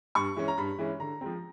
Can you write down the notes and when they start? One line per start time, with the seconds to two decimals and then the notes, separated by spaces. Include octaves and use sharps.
0.15 G2 C#6
0.37 E3 G#3 C#4
0.48 A#5
0.58 G2 B5
0.79 E3 G#3 C#4
1.00 D3 A#5
1.21 F3 G#3 C4